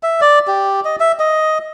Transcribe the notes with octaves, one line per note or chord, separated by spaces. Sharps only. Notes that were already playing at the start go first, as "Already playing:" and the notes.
E5
D5
G4
D#5
E5
D#5